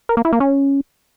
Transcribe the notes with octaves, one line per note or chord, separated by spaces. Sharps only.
A#4
A#3
E4
A#3
C#4